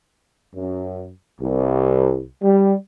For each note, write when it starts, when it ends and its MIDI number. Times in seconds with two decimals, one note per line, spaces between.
0.54 1.08 42
1.40 2.23 36
2.43 2.74 55